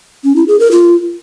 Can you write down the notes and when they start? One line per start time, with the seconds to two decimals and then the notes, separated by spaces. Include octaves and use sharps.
0.24 C#4
0.36 E4
0.48 G#4
0.60 A#4
0.71 F4